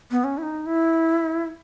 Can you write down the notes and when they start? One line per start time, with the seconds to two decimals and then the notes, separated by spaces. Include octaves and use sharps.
0.11 B3
0.24 C#4
0.38 E4
0.43 D#4
0.66 E4